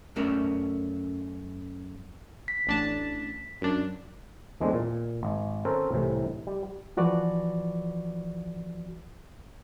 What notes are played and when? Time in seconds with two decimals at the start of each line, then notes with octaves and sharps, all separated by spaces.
0.16 F#2 A3 C#4 A#4 D5 E5
2.48 B6
2.67 A1 D4 A5
3.62 F#2 D4
4.60 E2 G#3 A3 C4 D4
4.73 A#2
5.23 G#1
5.65 C4 C#4 A4 A#4 C5
5.92 C2 A2 C3 E3
6.47 G3
6.97 E3 F3 F#4 B4 D5